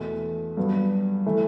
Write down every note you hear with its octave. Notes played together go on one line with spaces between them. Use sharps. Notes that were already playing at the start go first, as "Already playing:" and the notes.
Already playing: E2 B2 A3
G2 F#3 B3
E3 A3